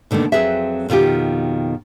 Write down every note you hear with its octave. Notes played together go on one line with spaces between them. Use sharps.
B2 D3 D#3 A3 A#3
F2 F#3 C4 G#4 B4 E5
F2 B2 D#3 F4 G4